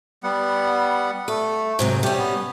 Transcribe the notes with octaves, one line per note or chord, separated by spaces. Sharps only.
G3 B3 F#5
A3 A4
G#2 C3 F#3
G3 A3 C#4 G4
B3